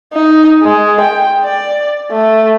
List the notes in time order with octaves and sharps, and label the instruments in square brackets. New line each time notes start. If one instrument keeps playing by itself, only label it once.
[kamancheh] D#4
G#3
G5
D5
A3